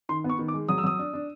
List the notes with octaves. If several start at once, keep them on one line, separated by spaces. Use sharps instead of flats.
D#3 C6
B3
C#6
D#3
D6
G#3
F#3 D#6
E6
F#3 D#6
D4
D4